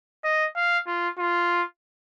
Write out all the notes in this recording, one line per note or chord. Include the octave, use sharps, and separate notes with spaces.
D#5
F5
F4
F4